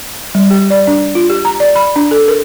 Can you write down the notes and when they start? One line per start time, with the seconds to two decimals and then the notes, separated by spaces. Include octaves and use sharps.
0.35 G3
0.50 G4
0.70 D5
0.87 D4
1.15 F4
1.30 G4
1.45 A#5
1.60 D5
1.76 B5
1.96 D4
2.11 A4
2.28 A#4